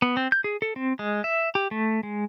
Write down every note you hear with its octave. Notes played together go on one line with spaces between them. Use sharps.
B3
C4
G6
G#4
A4
C4
G#3
E5
G4
A3
G#3